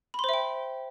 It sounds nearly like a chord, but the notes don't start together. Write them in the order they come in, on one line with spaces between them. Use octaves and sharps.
B5 C6 C5 E5 G5